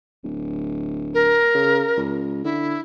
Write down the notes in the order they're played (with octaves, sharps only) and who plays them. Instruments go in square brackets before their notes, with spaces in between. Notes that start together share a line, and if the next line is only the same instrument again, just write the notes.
[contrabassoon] D1
[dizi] A#4
[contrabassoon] C#3
C#2
[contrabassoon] D3 [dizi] E4